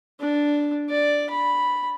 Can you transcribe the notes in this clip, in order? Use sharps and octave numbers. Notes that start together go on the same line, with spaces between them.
D4
D5
B5